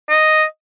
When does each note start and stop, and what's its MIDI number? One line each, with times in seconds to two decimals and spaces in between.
0.10 0.43 75